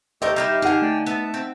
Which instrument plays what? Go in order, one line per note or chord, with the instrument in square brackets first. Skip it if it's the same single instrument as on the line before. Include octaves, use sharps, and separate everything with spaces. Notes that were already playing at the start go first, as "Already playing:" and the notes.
[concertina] A3 G4 A4 [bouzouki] A#4 C5 D5 [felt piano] D#5
[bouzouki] G3 D#4 E4 [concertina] G4 F5
[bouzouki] D3 G#4 [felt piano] D#4 F#5
[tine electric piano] A3 [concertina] D5 G5
[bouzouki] B3 [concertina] E5 A5
[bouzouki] C4